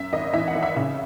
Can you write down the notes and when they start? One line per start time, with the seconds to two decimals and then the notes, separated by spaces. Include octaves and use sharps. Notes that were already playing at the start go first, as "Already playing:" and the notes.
Already playing: F#2 E5
0.13 G#1 D#5
0.34 E3 E5
0.48 F#5
0.55 G#1
0.63 E5
0.76 C#3 E5